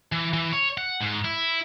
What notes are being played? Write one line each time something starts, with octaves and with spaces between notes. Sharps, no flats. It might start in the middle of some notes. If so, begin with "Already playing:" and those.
E3
E3
C#5
F#5
G#2
E4